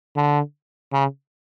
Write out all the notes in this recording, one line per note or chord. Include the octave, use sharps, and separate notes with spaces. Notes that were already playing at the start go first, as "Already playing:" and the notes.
D3
C#3